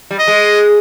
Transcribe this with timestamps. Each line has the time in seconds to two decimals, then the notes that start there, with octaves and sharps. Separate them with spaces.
0.11 G3
0.19 D#5
0.28 G#3